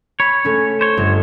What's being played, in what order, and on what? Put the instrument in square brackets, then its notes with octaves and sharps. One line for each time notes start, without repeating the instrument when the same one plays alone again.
[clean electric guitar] C#5 [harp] B5
[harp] A3 C#4
[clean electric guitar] C5 C#5
[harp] G1